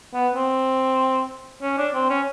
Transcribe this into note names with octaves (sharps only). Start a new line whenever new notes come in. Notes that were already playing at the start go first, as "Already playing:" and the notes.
B3
C4
C#4
D4
C4
C#4